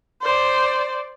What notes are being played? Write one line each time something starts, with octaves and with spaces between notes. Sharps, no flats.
C5 D5